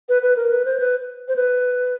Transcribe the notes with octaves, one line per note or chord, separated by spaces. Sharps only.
B4
B4
A#4
B4
C5
B4
C5
B4